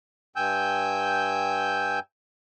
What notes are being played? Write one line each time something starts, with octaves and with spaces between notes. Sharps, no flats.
G2 G5 G#5 E6 G6